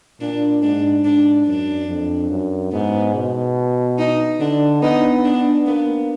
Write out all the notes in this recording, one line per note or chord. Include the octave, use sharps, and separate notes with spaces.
A#2 D4
G#2 D4
G#2 D4
F#2 D4
F2
F#2
G#2 B3
B2
D#4
D3 D4
B3 D#4
D4
A#3 B3